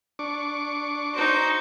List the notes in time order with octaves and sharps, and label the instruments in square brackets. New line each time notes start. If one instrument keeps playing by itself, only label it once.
[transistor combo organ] D4 C#6 D6
[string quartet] D#4 F#4 C5